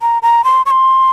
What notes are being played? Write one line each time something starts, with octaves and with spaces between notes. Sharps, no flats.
A#5
A#5
C6
C#6
C6